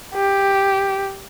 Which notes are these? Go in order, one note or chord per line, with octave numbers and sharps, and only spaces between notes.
G4